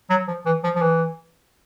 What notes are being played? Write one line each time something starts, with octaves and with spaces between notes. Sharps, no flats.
F#3
F3
E3
F3
F3
E3